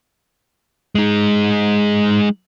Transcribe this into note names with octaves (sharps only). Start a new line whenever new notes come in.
G#3 D#4